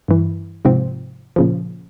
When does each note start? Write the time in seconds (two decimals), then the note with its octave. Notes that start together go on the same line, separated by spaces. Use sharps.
0.08 G2 E3
0.65 G#2 C3 F3 C4
1.36 A#2 C#3 F3